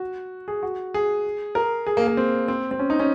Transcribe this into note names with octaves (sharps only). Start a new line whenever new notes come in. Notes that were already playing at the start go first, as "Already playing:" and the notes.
Already playing: F#4
G#4
F#4
G#4
A#4
G#4
A#3
A#3
C4
C4
C4
C#4
D#4
C#4